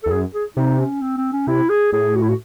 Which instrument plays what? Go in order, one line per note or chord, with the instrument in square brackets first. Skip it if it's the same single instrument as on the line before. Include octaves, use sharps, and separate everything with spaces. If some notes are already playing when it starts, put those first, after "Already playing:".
[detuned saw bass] E2 [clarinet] A4
[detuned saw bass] F#2 [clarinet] G#4
[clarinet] G#4
[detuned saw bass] C3 [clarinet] D#4
[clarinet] C#4
C4
C4
C#4
[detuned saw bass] C3 [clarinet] E4
[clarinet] G#4
[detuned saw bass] A2 [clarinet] G#4
[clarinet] F#4
E4
F#4